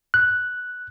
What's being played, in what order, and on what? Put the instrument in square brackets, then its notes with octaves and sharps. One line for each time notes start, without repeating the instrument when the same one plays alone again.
[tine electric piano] F#6